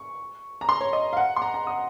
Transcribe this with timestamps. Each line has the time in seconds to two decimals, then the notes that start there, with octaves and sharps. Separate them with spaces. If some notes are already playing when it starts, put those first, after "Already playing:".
Already playing: C#6
0.61 A#5
0.69 C6
0.81 C#5
0.93 D#5
1.13 F5
1.17 F#5
1.36 C6
1.42 A#5
1.54 A#5
1.67 D#6